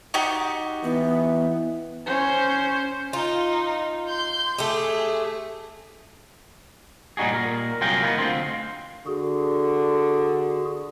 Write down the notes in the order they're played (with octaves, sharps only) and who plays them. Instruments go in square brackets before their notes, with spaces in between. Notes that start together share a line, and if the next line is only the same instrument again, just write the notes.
[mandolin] D#4 F#4 G4
[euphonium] E3 [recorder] B3
[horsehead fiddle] C#4 C5
[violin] D#4 [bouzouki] F4
[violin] C6 G6
[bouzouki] A3 G4 [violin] G#4
[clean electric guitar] A#2 G3 D#4 F#4 G#4
A#2 A#4
C2 F#3 F4 G#4 A#4 G5
A#3 B3 D#4
D2 C4 F4 C5
[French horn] D3 [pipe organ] F#4 G#4